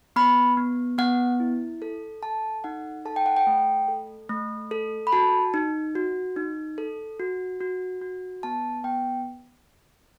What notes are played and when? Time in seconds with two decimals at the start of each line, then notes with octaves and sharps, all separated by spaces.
0.16 B3 B5
0.57 B3
0.98 B3 F#5
1.40 E4
1.82 A4
2.22 A4 A5
2.64 D#4 F#5
3.05 A4 A5
3.16 G5
3.26 F#5
3.37 G5
3.47 A3
3.88 A4
4.29 A3
4.71 A4
5.07 B5
5.12 F#4 A5
5.54 D#4
5.95 F#4
6.36 D#4
6.78 A4
7.19 F#4
7.61 F#4
8.02 F#4
8.43 B3 A5
8.84 B3 G5